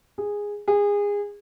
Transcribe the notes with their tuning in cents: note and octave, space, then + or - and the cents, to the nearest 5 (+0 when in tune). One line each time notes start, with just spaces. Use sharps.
G#4 -10
G#4 -25